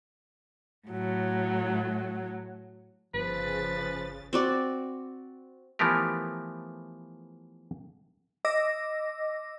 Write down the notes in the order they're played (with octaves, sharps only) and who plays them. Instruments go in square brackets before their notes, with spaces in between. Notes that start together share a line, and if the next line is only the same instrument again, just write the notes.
[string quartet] A2 F#3
[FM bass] G1 [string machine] C#3 A6 [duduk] F3 [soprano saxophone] B4
[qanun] C4 F#4 D5
[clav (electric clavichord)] E3 F3 A3 B3 G4 A#4
[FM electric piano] D#5 D6 E6 A#6